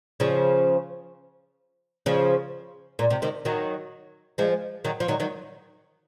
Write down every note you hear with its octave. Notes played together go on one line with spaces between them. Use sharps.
C#3 F3
C#3 F3
A#2
C3
C3 D#3
D#3 F#3
F3 G#3
D#3 F#3
F3
D#3 F#3
D#3 F#3